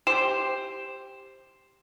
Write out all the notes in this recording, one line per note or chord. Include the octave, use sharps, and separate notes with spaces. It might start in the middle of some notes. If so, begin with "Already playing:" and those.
G4 C5 E7